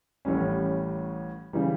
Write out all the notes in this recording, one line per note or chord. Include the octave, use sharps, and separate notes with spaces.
A1 A2 G3 C#4
C#3 E3 G3